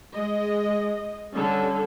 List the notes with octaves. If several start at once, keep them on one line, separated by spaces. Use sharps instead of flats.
G#3 D#5
D3 G3 C#4 A4